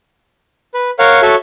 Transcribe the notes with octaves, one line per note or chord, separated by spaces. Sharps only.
B4
A#4 C#5 F5 F#5
F#4 A4 C#5 E5